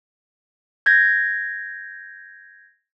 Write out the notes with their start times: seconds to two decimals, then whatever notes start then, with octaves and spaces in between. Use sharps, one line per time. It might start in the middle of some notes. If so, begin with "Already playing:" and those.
0.86 G6 G#6 A#6